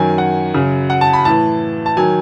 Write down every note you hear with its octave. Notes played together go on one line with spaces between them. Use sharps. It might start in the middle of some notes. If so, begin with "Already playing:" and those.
Already playing: F#2 D#3 F#3 G#5
F#5
F#2 C#3 F#3
F#5
A5
B5
A2 E3 A5
A5
D#3 F#3 G#5